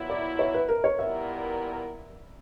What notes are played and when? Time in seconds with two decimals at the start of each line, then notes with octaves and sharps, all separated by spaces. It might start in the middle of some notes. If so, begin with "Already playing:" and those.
Already playing: A#2 F#3 B3 E4
0.10 D5
0.39 C#5
0.54 B4
0.69 A#4
0.84 C#5
0.99 A#2 G3 B3 E4 A#4 E5